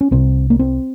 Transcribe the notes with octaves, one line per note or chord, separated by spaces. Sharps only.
C#4
C2 C3 C4
A#3
C4